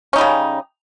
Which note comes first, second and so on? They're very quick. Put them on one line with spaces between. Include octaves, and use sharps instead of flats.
C#4 D#4 G3 C#3